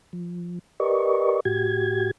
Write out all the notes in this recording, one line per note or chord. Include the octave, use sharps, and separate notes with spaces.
F3
G4 A#4 B4 D5 D#5 C#6
A2 F#4 G4 G#6